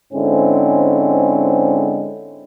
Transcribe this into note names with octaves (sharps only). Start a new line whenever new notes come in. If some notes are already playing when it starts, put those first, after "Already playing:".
G#2 D3 G#3 C4 C#4 E4